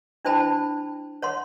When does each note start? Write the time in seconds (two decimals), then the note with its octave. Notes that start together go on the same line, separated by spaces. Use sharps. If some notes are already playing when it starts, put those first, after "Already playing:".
0.25 D4 E4 C5 G5 A5 B5
1.22 C#5 F#5 C6